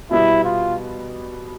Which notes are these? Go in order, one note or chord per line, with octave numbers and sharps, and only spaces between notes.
B2 G3 B3 E4
F4